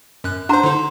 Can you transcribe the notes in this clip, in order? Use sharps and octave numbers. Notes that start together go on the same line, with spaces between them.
F#2 F#6
D4 C5 F#5 A#5 C6
D3 D#4